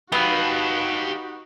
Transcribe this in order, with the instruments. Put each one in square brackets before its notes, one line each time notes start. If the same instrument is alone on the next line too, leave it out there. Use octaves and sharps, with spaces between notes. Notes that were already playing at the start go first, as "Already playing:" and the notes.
[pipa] B3 [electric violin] D#4 F#4 [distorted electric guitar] G4 F5